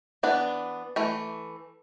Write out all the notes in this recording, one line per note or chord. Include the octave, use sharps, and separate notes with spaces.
E3 B3 D4
E3 A3